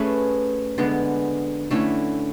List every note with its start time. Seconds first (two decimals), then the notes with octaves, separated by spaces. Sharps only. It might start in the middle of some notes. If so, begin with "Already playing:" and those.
Already playing: A3 C#4 G#4 B4
0.78 D3 G#3 B3
1.71 D3 A3 C#4 E4